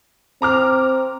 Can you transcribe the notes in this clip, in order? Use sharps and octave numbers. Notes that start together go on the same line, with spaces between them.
C4 A#5 D6 F6